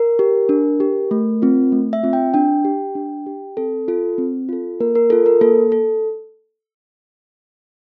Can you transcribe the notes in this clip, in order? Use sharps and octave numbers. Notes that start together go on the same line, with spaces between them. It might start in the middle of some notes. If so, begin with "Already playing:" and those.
Already playing: A#4
G4
D4
G4
A3
C4 F4
A3
E5
C4 F4
G5
D4 G5
G4
D4
G4
C4 A4
F4 A4
C4
F4 A4
A#3 A#4
A#4
F4 A4
A#4
A#3 A4
A4